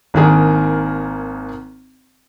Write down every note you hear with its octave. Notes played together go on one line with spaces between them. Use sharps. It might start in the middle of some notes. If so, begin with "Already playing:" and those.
G#1 D#3 A#3 D4 G#4